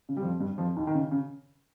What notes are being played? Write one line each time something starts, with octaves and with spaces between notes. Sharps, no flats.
C#3
G3
F2 F3
G2 G3
F2 F3
D#2 D#3
D#3
C#3
C#3